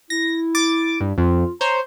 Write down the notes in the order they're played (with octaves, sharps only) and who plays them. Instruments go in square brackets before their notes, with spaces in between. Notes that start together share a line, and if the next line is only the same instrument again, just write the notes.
[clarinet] E4 [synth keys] A#6
[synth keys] D6 A6
G2
[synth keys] F2 [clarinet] F4
[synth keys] C5 C#5 [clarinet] A#5